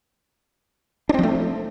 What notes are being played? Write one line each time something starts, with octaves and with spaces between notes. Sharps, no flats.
F3 A3 C4 D4